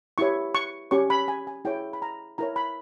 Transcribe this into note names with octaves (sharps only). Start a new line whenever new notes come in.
E4 G4 C#5 C#6
C#6
C#4 G4 C#5 C#6
B5
G#5
G#5
E4 G#4 C#5 G5
B5
A#5
E4 A#4 C#5 A#5
B5